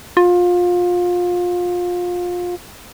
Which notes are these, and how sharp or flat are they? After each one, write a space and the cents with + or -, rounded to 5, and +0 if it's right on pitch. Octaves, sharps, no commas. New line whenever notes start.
F4 +25